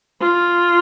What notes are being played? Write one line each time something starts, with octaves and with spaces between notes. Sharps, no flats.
F4